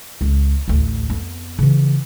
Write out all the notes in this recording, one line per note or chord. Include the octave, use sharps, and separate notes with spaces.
C#2
A1 D2
F2 B3
C#3 E3